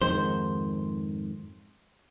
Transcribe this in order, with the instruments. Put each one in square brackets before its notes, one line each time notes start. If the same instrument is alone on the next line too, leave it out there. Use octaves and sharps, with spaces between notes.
[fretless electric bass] F2 G#2 D#3 [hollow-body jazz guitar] C5